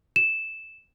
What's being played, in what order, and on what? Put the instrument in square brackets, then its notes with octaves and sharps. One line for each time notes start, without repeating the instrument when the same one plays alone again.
[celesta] E7